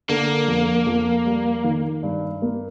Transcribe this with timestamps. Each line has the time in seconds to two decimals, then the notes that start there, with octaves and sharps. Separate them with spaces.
0.09 D3 A#3
0.48 F2
0.87 F2
1.26 G3
1.64 D#3
2.03 G2
2.42 A#3